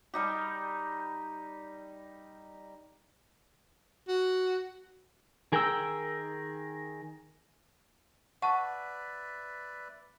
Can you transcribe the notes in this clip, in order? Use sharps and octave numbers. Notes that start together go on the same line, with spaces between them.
G3 D#4 G4
F#4
D#3 G#4 A#4 G5 E6
B4 D5 E5 F#5 A5 C#6